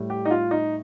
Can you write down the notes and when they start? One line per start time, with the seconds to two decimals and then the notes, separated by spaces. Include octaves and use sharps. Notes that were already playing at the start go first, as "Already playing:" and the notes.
Already playing: A2 G3
0.10 G4
0.25 D#4
0.31 F4
0.51 D#4